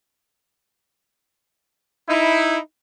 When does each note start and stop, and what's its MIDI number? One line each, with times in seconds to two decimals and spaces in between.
2.08 2.58 63
2.08 2.58 64